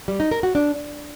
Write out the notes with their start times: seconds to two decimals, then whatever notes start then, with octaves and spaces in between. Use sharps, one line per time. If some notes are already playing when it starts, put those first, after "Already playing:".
0.08 G3
0.20 D#4
0.31 A#4
0.43 F#4
0.55 D4